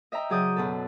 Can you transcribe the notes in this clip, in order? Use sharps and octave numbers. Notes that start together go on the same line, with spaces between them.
D#5 E5 G5 A#5
C#3 F#3 G#4 D5 D#6 G6
F#2 B2 A4